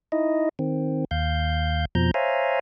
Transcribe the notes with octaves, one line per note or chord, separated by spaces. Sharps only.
D#4 E4 D#5
D#3 C4
D#2 F5 G6
F2 B2 F3 A#5 G6
C5 C#5 E5 F5 G#5 A#5